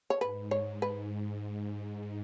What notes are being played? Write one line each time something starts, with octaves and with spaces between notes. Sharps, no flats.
C#5
G#2 B4
C#5
G#2 B4